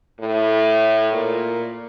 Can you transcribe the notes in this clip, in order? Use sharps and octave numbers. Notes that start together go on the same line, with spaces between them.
A2
A#2